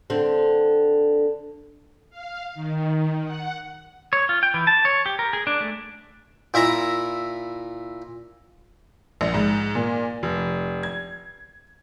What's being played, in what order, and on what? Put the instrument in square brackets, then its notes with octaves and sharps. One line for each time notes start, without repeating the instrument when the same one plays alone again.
[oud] D3 C4
[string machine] F5
D#3
F#5
[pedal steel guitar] C#5
F4
G5
E3
A5
C#5
G4
A#4
G#4
D4
A3
[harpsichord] A#2 E4 E5 A#5
[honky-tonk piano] A#1
G#2
A#2
F1
G#6